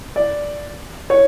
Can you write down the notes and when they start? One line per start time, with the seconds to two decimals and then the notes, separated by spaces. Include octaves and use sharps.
0.16 D5
1.10 C#5